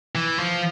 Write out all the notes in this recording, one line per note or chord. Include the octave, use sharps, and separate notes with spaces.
E3
F3